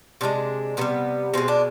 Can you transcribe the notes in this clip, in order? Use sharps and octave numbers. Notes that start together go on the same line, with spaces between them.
C3 F3 G#3 D4
C3 D#3 G3 B3
B2 G#3 C4
D4